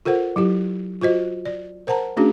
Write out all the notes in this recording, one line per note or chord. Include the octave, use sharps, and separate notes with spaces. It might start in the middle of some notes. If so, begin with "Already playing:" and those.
F4 A4 A#4 C5 F#5
F#3 E4 G4
F4 F#4 C5 D#5
D5
A#4 C5 F#5 A5 A#5
A3 C#4 D4 F#4 G#4